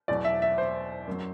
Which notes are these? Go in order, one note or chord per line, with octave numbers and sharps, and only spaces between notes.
E2 B2 F#3 D5
E5
E5
C5
F#2 F#3